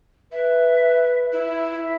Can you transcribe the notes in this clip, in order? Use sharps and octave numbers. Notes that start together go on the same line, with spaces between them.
B4 E5
E4
E5